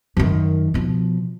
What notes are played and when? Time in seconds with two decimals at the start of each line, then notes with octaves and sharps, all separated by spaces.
0.17 F#2 D#3
0.74 B2 F3